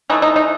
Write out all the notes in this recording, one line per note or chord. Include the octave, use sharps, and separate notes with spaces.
E3 A3 D#4
D#4
D#4